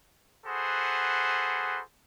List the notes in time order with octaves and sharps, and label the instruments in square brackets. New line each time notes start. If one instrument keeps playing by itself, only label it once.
[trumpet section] F#4 G#4 A4 B4 C5 F#5